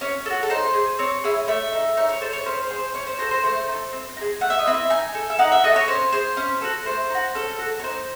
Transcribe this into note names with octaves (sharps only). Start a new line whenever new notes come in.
C#4 C#5
A4
F#4
A4
D#4 C5
G#4
C4 C#5
E4 G#4
A3 E5
D#4 A4
D#4 C#5
C#5
A4 C5
C#5
C#4 C5
C5
G#4
C5
C#4 C#5
C5
F#4 A4 C5
C5
A3 C5
D#4
A4
C4
D#4
G#4
A3 F#5
E5
D#5
C4 E4 E5
D#4 G#5
A4
E5
D#4 F#5
E5
F#4 A4 D#5
C#5
C#4 C5
G#4 C5
C#4
F#4 A4
A3 C5
D#4
F#4
C#4 A4
F#4 A4
C#5
D#4 C5